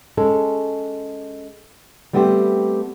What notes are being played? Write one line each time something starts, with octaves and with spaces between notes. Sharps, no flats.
G#3 C#4 A4
G3 A3 B3 C4 F4 G4